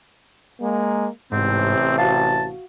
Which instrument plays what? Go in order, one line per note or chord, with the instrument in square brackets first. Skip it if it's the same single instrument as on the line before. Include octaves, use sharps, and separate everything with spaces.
[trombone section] G#3 A#3
[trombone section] A1 C3 [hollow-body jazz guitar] G#2 [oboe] C4
[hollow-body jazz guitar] F#4 F5 [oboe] A5